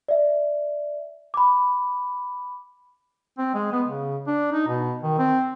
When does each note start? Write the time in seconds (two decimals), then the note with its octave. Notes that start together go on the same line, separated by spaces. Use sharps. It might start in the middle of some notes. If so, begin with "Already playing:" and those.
0.09 D5 E5
1.34 B5 D6
3.38 C4
3.54 G#3
3.72 B3
3.88 C#3
4.27 D4
4.52 D#4
4.68 B2
5.03 D#3
5.18 C4